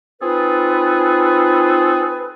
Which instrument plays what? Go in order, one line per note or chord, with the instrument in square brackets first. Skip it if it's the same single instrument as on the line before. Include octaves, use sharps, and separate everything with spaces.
[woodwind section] C4 D#4 F4 G#4 A4 B4